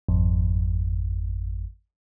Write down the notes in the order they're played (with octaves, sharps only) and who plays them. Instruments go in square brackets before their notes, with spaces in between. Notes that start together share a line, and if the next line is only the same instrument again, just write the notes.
[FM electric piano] G#1 F2